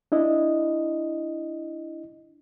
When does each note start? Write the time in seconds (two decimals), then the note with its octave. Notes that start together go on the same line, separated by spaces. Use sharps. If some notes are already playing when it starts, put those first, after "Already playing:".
0.12 D4 E4 D#5